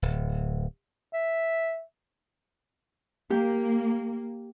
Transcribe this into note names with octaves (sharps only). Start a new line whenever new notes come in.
D1
E5
A#3 G4